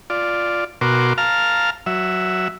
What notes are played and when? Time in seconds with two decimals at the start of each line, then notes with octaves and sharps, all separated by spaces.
0.10 F4 D5
0.81 B2 F#4 A#4 C6 D6
1.18 F5 A5 A#5 F6
1.86 F#3 E5